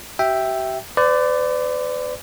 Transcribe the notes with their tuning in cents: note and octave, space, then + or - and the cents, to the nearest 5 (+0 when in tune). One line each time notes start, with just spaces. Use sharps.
G4 -45 E5 +0 G5 +0
B4 +45 D5 +0